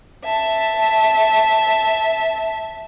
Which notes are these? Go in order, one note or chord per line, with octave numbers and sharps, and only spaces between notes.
E5 A5